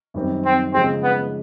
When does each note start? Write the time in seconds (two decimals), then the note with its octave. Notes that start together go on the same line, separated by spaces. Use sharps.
0.14 F#2 D#3 G3 C4
0.45 C4
0.74 C#3 F3 G#3 C4
1.03 B3